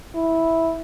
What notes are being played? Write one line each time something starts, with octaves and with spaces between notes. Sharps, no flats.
E4